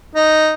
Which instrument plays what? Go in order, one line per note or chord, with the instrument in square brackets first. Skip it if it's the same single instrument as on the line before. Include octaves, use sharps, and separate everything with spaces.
[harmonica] D#4